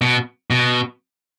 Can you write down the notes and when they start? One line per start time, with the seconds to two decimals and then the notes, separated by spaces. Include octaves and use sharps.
0.01 B2
0.50 B2